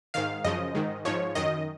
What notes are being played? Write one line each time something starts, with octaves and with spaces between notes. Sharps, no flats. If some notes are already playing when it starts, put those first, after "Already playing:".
G#2 D#3 F5
F#2 C#3 F3 D#5
G#2 D#3
G#2 F3 C#5
F#2 D#3 D#5